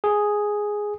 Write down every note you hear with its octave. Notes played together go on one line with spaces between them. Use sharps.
G#4